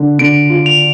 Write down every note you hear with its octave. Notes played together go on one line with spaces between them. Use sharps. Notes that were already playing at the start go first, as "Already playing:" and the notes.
Already playing: D3
D3 D7
F4
F7